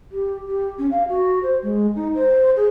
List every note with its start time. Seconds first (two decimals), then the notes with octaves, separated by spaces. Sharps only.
0.12 G4
0.47 G4
0.79 C#4
0.91 F5
1.08 F#4
1.43 C5
1.63 G#3
1.95 D#4
2.15 C5
2.56 G#4